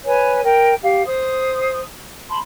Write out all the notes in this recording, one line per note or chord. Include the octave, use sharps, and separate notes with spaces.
B4 C#5 G#5
A#4 G5
G4 F5
C5 D#6
A5 B5 C6